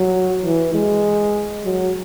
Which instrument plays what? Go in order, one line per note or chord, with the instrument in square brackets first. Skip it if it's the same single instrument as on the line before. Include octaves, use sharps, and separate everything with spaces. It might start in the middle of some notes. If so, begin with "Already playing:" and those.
Already playing: [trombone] F#3
E3
G#3
F#3